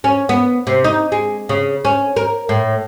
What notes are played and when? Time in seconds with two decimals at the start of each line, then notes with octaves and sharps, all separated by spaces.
0.04 C#4
0.29 B3
0.67 C3
0.84 D#4
1.12 G#3
1.49 C#3
1.85 C#4
2.16 A#4
2.49 A2